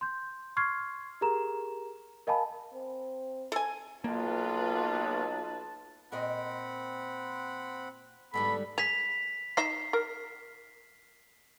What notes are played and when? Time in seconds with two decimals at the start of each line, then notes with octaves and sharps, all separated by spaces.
0.01 C6 G6
0.57 C6 C#6 F6 G#6 C7
1.21 G4 G#4 A#4 A#5 E7
2.27 A#4 D#5 F5 G#5 A5 B5
2.73 C4
3.52 A4 G#5
4.04 B1 A#3 F4 B4 A5
6.12 A#2 C4 A#4 D#5 F#5 B5
8.34 G#2 D3 G3 B3 A4 B5
8.78 G#4 B6 F7
9.57 D#4 D#5 E5 C7
9.93 A#4